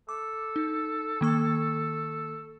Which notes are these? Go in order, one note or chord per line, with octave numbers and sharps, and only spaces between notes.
A4 D6
D#4
D#3 A#3 C#6